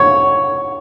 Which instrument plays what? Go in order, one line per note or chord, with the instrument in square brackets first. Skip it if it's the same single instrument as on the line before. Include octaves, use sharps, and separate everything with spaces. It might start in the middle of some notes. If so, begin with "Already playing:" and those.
Already playing: [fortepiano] C#5